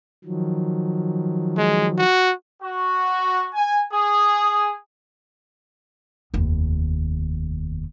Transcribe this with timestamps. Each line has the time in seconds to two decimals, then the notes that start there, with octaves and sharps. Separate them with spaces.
0.24 D#3 F3 F#3
1.58 G#3
1.98 F#4
2.62 F#4
3.54 G#5
3.92 G#4
6.34 F1 D#2